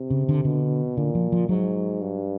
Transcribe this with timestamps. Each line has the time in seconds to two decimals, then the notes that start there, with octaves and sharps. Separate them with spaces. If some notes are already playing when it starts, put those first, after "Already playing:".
Already playing: C3
0.10 C#3
0.29 D3
0.45 B2 D3
0.97 A#2 D3
1.15 F3
1.32 F3
1.49 G#2 F#3
2.01 G2